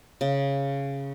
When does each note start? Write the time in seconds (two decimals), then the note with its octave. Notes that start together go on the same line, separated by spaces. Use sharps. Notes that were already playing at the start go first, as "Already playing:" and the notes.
0.21 C#3